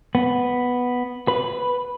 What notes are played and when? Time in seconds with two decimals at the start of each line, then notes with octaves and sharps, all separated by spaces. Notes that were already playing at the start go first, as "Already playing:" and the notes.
0.15 B3
1.28 B4